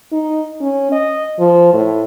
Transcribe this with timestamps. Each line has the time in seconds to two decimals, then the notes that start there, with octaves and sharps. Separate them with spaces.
0.12 D#4
0.61 C#4
0.92 D#5
1.39 F3
1.73 A2